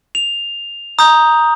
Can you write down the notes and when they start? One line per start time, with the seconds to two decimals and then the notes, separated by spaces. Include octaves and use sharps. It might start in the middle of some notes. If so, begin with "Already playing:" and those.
0.15 F7
0.99 A#5 D#6 G6